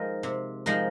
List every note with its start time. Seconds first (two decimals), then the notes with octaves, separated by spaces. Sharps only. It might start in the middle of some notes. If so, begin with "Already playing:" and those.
Already playing: F3 G#3 D#4 A#4
0.23 C3
0.66 F3 G#3 D#4 A#4